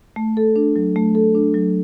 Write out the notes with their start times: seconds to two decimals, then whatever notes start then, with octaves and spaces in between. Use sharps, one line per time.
0.16 A3
0.37 A4
0.56 D4
0.76 F#3
0.96 A3
1.15 A4
1.35 D4
1.54 F#3